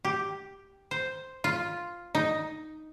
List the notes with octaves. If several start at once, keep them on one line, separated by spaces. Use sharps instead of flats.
G4
C5
F4
D#4